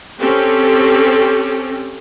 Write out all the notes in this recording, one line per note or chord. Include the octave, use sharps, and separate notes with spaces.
C4 C#4 G4 A4